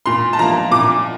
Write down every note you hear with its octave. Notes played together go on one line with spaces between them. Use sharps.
A#2 C6
A5
F3 A#3 A#5
A#2 D6